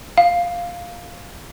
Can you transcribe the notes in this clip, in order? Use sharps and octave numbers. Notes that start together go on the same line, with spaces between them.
F5